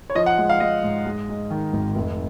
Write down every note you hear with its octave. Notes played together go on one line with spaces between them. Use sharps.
C#5
F3 D#5
F#5
G#3
F5
G#3 D#5
G#2
G#3
G#3
D#3
G#1
F1